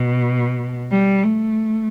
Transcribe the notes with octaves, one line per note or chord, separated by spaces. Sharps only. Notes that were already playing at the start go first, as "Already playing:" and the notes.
Already playing: B2
G3
A3